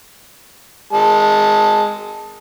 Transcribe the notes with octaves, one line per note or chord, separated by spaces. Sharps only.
G#3 A5